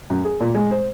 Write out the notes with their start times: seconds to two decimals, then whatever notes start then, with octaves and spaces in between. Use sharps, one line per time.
0.10 F#2
0.25 G#4
0.40 A#2
0.55 G#3
0.71 C5